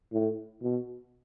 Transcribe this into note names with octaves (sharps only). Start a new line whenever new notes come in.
A2
B2